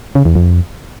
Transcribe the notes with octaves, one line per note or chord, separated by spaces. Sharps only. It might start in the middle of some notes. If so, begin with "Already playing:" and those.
C#3
E2
F2